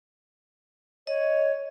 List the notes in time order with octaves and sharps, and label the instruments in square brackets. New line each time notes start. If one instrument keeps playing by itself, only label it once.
[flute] C#5 [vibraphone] D#5